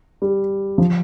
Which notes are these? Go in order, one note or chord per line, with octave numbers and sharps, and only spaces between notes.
G3
F3